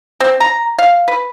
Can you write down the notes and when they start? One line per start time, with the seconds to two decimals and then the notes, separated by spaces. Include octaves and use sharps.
0.20 C4
0.40 A#5
0.78 F5
1.08 B4